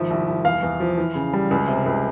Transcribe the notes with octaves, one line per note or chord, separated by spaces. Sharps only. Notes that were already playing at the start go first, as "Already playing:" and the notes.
Already playing: G#1 F3 E5
C2
C2
E2 F5
E2
F3
E3
C#3
G3
C#2
C3
C#2